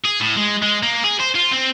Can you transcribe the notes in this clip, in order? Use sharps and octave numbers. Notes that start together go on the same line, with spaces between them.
G#4
A2
G#3
G#3
A#3
G#4
C5
F4
C4